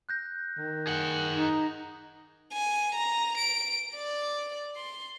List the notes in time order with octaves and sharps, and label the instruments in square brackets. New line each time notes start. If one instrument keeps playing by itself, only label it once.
[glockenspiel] F#6 G6 A#6
[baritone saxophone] D#3
[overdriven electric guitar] G#4 F#5
[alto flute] D#4
[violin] G#5
A#5
D7
D5
C6